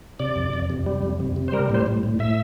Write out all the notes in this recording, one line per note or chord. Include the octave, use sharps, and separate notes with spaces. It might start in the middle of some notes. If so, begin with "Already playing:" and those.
C3 D5
F2
F2
C3
G3
F2
C3
C3
C5
G3 A#4
A2 C5
A2
A2
A2 E5